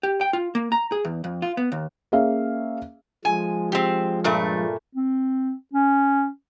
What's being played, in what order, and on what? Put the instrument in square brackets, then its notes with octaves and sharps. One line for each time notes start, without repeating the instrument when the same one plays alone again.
[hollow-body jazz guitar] G4
G5
F4
A#3
A#5
G#4
E2
F2
F4
B3
D#2
[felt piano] A#3 C#4 G#4 E5 F5
[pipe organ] F3 G#3 [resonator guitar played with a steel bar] G#5
[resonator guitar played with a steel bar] C4 G4
G2 A#2 A3
[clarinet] C4
C#4